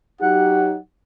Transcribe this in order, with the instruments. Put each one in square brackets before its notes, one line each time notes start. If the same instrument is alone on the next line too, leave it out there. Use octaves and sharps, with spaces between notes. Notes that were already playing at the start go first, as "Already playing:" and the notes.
[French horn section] F#3 D#4 G4 [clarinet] F#5